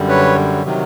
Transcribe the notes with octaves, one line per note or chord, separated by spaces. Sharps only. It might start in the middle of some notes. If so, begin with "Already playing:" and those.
Already playing: F#2 D3 G3
B4 C#5
C3 D#3 F#3